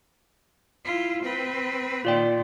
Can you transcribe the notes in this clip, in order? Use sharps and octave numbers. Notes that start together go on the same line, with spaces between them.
E4 F4
C4 B4
A#2 D#3 F4 D5 G5